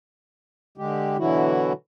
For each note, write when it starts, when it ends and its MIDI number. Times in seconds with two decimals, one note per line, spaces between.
0.78 1.17 50
0.78 1.17 56
0.78 1.17 67
1.18 1.73 47
1.18 1.73 50
1.18 1.73 52
1.18 1.73 54
1.18 1.73 64
1.18 1.73 66